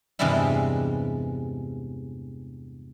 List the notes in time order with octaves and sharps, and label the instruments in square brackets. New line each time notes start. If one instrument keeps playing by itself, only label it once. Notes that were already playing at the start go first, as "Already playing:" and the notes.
[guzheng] E2 G2 C3 G3 G#3 E4